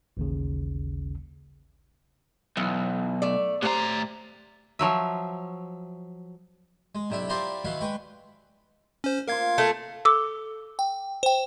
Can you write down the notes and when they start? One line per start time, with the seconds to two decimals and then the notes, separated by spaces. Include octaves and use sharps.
0.17 A1 D#2 C#3
2.57 B1 E3
3.22 A3 D5
3.62 A2 G4 C5 A#5
4.79 F3 F#3 E5
6.95 G#3
7.10 B1 C3 D4 E4 E5
7.29 E4 F4 G4 A#4 C5 D5
7.65 D#3 E3 F#3 E4 F5 F#5
7.81 G#3 B4 G5 C#6
9.04 C#4 C5
9.28 A#3 F4 A#4 F5 G#6
9.58 A3
10.05 A4 D6 E6
10.79 G5
11.23 C5 G5